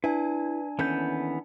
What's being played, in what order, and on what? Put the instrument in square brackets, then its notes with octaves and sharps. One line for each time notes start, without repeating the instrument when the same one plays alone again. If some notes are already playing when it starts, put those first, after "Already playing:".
[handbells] D4 G#5 [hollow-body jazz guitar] E4 [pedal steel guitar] B4
[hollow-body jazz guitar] D#2 C#4 A4 [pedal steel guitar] E3 B3 G6